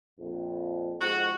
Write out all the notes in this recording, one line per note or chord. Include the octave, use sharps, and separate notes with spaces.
A#1 F2
F2 G#2 F#4